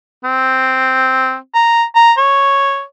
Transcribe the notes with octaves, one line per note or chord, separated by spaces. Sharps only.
C4
A#5
A#5
C#5